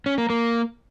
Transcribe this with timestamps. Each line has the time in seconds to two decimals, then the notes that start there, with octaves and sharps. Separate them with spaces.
0.06 C#4
0.18 A#3
0.30 A#3